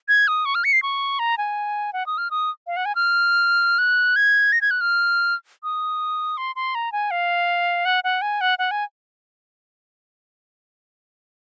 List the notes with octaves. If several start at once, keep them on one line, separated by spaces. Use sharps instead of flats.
G#6
D#6
C#6
F6
C#7
C7
C#6
A#5
G#5
F#5
D#6
F6
D#6
F5
F#5
G#5
F6
F#6
G#6
A#6
G#6
F#6
F6
D#6
C6
C6
A#5
G#5
F5
F#5
F#5
G#5
F#5
F#5
G#5